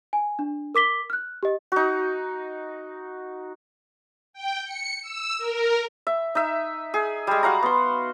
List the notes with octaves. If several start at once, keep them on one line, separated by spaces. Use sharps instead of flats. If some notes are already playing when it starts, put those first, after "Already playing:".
G#5
D4
A#4 D6 B6 G7
F6 F#6
G4 D#5
D#4 F#4
G5
C#7
E6
A#4
E5
D#4 E5
G#4
G3 G#3
F#4 F5 F#5 A#5
B3 C6